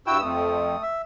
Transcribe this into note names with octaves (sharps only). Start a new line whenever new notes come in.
G2 E4 F#4 G5 E6
F2 A3 D#6
E5